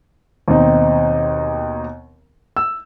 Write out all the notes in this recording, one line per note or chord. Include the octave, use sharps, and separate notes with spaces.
D#2 B2 C4 D#4
E6